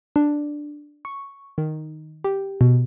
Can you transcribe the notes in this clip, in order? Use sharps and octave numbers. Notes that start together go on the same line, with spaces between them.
D4
C#6
D#3
G4
B2